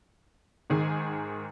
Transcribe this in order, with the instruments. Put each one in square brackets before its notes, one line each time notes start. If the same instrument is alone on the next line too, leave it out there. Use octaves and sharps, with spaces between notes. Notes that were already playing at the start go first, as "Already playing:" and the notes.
[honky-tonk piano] G#2 D#3 G#4 G#5